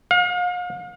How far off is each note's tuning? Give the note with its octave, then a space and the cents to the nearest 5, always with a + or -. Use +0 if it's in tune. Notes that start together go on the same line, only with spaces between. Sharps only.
F5 +40